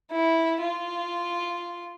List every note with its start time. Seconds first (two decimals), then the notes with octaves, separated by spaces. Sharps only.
0.11 E4
0.62 F4